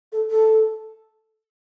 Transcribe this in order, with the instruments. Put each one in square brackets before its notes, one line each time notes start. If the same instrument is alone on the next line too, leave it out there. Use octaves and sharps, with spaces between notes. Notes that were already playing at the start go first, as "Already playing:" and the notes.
[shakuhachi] A4
A4